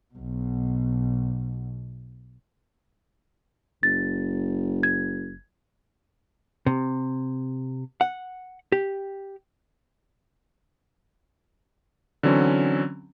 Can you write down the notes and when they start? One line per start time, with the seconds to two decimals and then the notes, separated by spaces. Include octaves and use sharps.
0.14 B1 B2
3.83 F#1 A6
4.83 G#6
6.66 C3
8.01 F#5
8.72 G4
12.23 D3 E3 F#3 C4 C#4